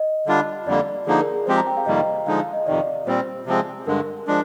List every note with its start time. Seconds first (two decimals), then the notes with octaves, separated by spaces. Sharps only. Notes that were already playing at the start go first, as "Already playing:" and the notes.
Already playing: D#5
0.26 D3 G3 D4 F4
0.66 F2 D3 G3 A#3 D5
1.06 D3 F3 A#3 D#4 G#4
1.20 A#4
1.34 G#4
1.46 F3 G#3 C4 G4 C5
1.57 A#5
1.67 G5
1.77 F5
1.86 F2 C3 D#3 G3 A#3 D#5
2.26 D3 F3 G#3 D#4 F5
2.40 F5
2.53 D#5
2.66 F2 C3 D#3 D5
3.06 A#2 G3 C4 C5
3.46 C3 F3 G#3 C4
3.87 G2 D3 G#3 A#4
4.27 F3 G#3 D4